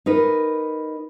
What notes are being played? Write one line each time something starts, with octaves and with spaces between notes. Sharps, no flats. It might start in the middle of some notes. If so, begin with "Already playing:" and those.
D#4 A#4 B4